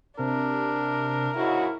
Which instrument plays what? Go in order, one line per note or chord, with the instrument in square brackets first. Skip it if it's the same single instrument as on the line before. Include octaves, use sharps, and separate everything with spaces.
[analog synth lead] C3 [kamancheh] D4 [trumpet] A#4
[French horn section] G#2 C#3 F#4 [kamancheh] E4